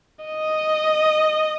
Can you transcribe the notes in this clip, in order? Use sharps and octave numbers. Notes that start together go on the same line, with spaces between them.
D#5